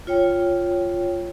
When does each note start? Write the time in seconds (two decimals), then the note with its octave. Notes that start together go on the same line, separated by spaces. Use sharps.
0.07 F4 C#5 G5